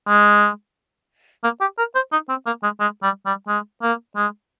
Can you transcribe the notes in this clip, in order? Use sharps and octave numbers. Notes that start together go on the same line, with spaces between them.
G#3
A#3
G4
A#4
C5
D#4
C4
A#3
G#3
G#3
G3
G3
G#3
A#3
G#3